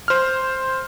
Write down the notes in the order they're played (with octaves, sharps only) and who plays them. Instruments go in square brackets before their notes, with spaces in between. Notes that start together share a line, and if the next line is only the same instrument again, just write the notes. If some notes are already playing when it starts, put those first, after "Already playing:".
[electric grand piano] C5 F6